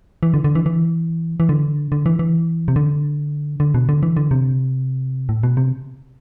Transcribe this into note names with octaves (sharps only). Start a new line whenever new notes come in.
E3
D3
D3
E3
E3
E3
D3
D3
E3
E3
C3
D3
D3
B2
D3
E3
D3
C3
A2
B2
C3